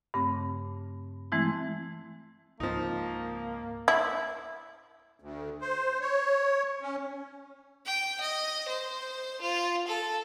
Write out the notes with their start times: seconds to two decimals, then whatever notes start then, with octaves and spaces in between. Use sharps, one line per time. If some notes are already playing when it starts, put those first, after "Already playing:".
0.14 G2 C#3 A3 C4
1.32 E3 G#3 A3 C4 E4
2.60 C#2 G#2 F3 A#3 C4 D#4
3.88 E4
5.20 D2
5.61 C5
6.01 C#5
6.82 C#4
7.86 G5
8.21 D#5
8.68 C5
9.41 F4
9.87 A4